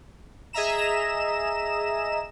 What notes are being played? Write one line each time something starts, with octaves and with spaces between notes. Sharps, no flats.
G#4 D#5 E5 A#5 E7